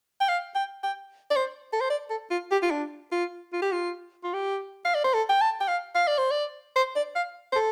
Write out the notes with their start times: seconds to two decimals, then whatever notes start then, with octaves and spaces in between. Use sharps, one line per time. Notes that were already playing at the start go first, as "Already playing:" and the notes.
0.21 G5
0.29 F5
0.55 G5
0.83 G5
1.31 D5
1.36 C5
1.73 A4
1.81 C5
1.90 D5
2.10 A4
2.31 F4
2.51 G4
2.63 F4
2.71 D4
3.12 F4
3.53 F4
3.62 G4
3.72 F4
4.24 F4
4.33 G4
4.85 F5
4.95 D5
5.04 C5
5.14 A4
5.29 G5
5.41 A5
5.61 G5
5.68 F5
5.95 F5
6.07 D5
6.18 C5
6.31 D5
6.76 C5
6.96 D5
7.15 F5
7.52 C5
7.56 A4